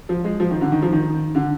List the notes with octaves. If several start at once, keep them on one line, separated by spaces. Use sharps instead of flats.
F3
G#3
F3
D#3
D3
D#3
F3
D#3
D3